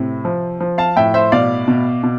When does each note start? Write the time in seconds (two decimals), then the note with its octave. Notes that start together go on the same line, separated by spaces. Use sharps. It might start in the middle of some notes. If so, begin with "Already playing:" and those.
Already playing: A2 C3
0.25 F3
0.61 F3
0.78 F5 A5
0.96 A2 E5 G5
1.14 C5 E5
1.32 B2 D5 F5
1.68 B2
2.03 B2